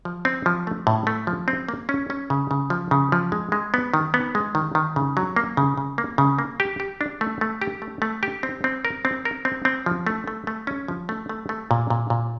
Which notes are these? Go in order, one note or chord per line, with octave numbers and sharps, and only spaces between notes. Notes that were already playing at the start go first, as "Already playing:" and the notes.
F3
C4
F3
A3
A2
A3
F3
C4
A#3
C#4
C#4
C#3
C#3
F3
C#3
F3
G#3
G#3
B3
D#3
B3
G#3
D#3
D#3
C#3
F#3
A#3
C#3
C#3
A#3
C#3
A#3
G4
G4
D4
A3
A3
G4
A3
A3
G4
C4
C4
A#4
C4
A#4
C4
C4
F3
A3
A3
A3
C#4
F3
A3
A3
A3
A#2
A#2
A#2